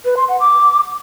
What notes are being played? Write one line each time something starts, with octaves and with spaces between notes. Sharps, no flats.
B4
C6
F#5
D6